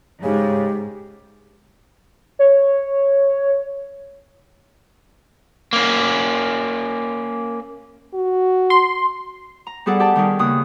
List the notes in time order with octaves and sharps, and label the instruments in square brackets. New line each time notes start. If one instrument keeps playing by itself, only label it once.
[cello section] G#2 [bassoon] C#3 [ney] G4
[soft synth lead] C#5
[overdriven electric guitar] A#3 C#4
[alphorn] F#4
[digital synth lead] C6
[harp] A#5
G3 B3 G#4 A4 D5 F#5
G4 D5 A5
D#3 G3 C#4 G#4
D#2 C#3 D#6 F#6